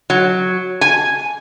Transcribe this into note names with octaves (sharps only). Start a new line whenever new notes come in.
F#3
G#5